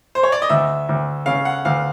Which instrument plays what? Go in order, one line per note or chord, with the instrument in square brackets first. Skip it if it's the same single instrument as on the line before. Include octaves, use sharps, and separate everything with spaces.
[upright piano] C5
C#5
D5
D#5
[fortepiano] D2 [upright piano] E5
[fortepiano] D2
[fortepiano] C#3 [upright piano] F5
[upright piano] F#5
[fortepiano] D2 [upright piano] F5